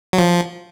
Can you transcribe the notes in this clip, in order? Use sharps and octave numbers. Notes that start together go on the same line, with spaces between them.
F#3
F3